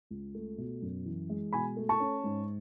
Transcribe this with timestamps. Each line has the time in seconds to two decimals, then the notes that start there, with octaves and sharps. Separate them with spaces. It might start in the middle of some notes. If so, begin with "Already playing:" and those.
0.10 C#2
0.35 A3
0.58 B2
0.82 F#2
1.06 E3
1.30 G#3
1.53 B2 G#5 B5
1.77 A3
1.89 A5 C#6
2.00 C#4
2.24 G#2